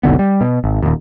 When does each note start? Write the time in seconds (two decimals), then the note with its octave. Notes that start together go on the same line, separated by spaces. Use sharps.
0.03 F1 B1 D3 B3
0.19 G3
0.41 B2
0.64 G#1
0.82 D#1 D#2